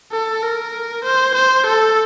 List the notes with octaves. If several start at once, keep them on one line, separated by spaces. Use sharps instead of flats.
A4
A#4
C5
C5
A4